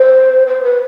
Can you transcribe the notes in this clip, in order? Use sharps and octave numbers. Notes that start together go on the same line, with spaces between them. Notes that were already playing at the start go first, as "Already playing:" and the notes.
Already playing: C5
C5
B4